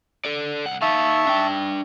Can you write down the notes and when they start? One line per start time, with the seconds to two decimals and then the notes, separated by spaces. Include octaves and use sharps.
0.25 A4 D5
0.66 C2 F#5
0.82 D#4 E5 F5 A5 C#6
1.27 D4 G5